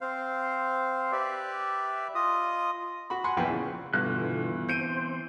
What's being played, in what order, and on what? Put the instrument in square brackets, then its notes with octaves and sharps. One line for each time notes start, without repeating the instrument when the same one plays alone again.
[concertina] C4 C5 F5
G4 B4 D5 E5
F4 D#5 D#6
[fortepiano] F#4 B5
F#5 G#5 B5 C6
A#1 E2 F3 B3 G5 G#5
C#3
[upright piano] G2 [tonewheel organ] B2 D3 F4 [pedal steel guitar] E3 F#6 [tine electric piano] B3
[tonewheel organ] C4 C5 [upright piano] G6 D7 D#7